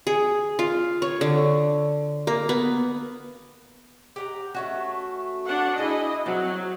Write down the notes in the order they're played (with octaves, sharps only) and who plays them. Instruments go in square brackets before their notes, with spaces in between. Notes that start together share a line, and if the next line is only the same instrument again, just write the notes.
[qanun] G#4
F4
C#5
D3
A#3
B3
[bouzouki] G4 F#5 A#5
A3 C#4 F#4
[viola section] D4 F#5
[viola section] E4 D#5 [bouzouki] G#4
[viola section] F#3 [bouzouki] C4